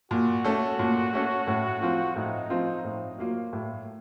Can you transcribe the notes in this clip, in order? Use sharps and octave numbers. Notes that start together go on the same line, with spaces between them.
A#2 F#4
A3 C#4 A4
A#2
A3 C#4 A4
A2
F3 C4 F4
A2 D#4
F3 C4 F4
A2
F#3 A#3 F4
A2